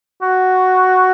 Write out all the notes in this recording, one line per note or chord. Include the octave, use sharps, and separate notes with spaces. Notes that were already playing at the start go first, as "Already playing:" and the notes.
F#4